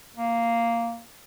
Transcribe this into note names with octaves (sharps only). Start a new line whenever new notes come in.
A#3